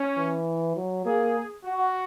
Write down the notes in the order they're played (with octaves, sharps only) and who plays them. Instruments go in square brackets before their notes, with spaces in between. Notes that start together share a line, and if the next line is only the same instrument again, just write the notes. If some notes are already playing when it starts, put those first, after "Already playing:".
Already playing: [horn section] C#4
[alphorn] E3
F#3
[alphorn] A#3 [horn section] G#4
[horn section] F#4